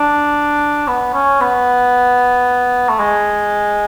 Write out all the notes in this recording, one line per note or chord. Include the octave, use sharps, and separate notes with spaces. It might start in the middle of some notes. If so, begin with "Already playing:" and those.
Already playing: D4
B3
C#4
B3
A3
G#3